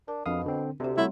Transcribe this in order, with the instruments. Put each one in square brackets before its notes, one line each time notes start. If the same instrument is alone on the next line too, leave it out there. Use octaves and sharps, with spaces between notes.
[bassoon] D4 [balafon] A#4
[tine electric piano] F2 F5 D#6 [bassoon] B2 [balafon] D4
[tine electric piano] D3 C4
[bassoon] D2 [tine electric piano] C3 [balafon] C4 G4
[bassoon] F#3 [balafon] G3 C6 [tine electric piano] A3 [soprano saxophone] E4